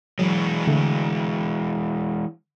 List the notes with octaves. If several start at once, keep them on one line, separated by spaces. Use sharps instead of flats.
E3 F#3 G#3
D3 A3